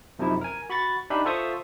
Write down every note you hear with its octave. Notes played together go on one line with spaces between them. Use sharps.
F#2 C3 F3 D#4 E4
A#4 G#5
F#4 B5 C#6 A6
D4 D#4 G4 E5 B5
F4 A4 C5 E5 C#6 D#6